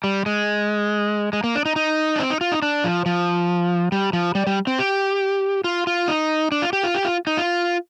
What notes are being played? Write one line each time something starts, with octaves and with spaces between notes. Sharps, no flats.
G3
G#3
G#3
A#3
D4
D#4
D#4
D4
C4
D#4
F4
D#4
D4
F3
F3
G3
F3
G3
G3
C4
G4
F4
F4
D#4
D4
F4
G4
F4
G4
F4
D#4
F4